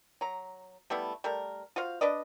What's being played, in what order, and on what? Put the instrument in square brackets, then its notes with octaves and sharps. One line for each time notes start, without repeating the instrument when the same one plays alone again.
[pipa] F#3 A#5
G3 A3 B3 E4
G3 A3 A#4
F4 F#4 C5 F5
D4 B4 D5 D#5